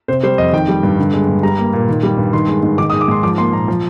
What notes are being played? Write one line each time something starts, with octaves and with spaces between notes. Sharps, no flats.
C3 C5
G3 C5
F2 D#5
D#3 G5
G3
G2
D3
G#3
G2
G3 A#5
A#3
A#2
D#3
G3
G2
D#3 C6
G#3
G#2
D#3 D6
D#6
G#3
D6
G#2 C6
F3 D6
A#3 C6
A#2 A#5
F3